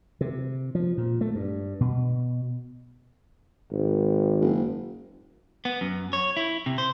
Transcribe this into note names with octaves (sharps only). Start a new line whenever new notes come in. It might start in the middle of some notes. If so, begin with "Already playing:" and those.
C3
F3
A#2
A3
G2
B2
G#1
F#1
B3
F#2
C#5
E4
C3
C5